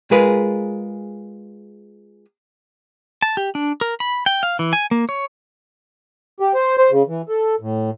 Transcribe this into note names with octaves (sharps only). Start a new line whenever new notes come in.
G#3 F4 G#4 A#4 B4
A5
G4
D4
A#4
B5
G5
F5
E3
G#5
A#3
C#5
G4
C5
C5
C#3
E3
A4
A2